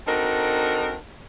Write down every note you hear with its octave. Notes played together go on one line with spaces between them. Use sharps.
C4 D4 D#4 F#4 A4 A#4